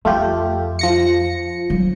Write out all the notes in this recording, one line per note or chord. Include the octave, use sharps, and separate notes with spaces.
F2 A3 F4 G4
F3 A#6 C#7
F#3 C#4